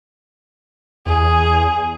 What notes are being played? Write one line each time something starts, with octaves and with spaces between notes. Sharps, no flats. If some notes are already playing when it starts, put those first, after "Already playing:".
E2 G#4